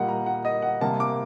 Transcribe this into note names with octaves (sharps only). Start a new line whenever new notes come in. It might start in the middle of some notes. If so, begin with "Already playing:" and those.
Already playing: A#2 G3 A#3 D#5 F#5
A#5
F#5
D#5
F#5
C3 G3 A#3 A5
D6